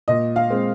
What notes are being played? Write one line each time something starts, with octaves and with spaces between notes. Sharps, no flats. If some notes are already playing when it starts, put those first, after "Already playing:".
A#2 D#5
F5
G#3 C4